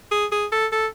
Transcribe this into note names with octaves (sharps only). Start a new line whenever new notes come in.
G#4
G#4
A4
A4